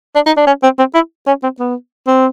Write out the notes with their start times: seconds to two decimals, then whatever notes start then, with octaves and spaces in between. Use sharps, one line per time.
0.15 D4
0.26 D#4
0.37 D4
0.47 C#4
0.63 C4
0.79 C4
0.95 E4
1.27 C#4
1.43 C4
1.60 B3
2.07 C4